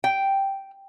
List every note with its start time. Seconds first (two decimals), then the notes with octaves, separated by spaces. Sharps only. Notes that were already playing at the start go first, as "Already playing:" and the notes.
0.04 G5